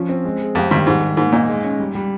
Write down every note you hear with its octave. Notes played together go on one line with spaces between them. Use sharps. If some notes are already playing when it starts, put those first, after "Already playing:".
Already playing: F3 C#4
C4
G#3
G#4
F2 G4
G2 D#3
G#2 G3
G3
G#2 A#3
A#2 D#4
G#3
C#4
G3
G3